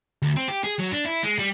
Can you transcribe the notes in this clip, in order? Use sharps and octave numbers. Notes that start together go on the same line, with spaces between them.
D2
C4
G4
G#4
F#3
D4
E4
G#3
G3